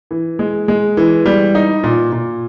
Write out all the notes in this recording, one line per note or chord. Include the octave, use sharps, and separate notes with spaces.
E3
G#3
G#3
E3
G3
D#4
A#2
A#2